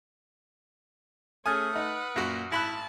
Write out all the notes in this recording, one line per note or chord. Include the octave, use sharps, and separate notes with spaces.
A3 C#4 G#4 G#5 D#6 F6 A6
D#4 B4 F#5
F#2 A#2 F#4
G#1 E4 A5 B5 F#6